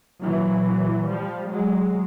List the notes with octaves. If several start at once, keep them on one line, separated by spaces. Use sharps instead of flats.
A#2 E3 F#3
F3 G3
F#3 G#3